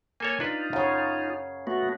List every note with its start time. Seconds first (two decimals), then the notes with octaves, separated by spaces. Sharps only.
0.20 A#3 A4 C#5 G#5
0.40 D4 D#4 F4 B4
0.73 F#2 C#3 C#5 F5
1.67 A3 B3 F#4